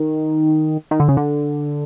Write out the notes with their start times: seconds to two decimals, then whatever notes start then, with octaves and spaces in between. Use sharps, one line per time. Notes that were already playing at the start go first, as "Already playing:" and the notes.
Already playing: D#3
0.91 D#3
1.00 D3
1.08 C#3
1.17 D3